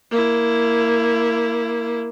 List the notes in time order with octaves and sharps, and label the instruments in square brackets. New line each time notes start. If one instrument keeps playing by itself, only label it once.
[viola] A#3 E4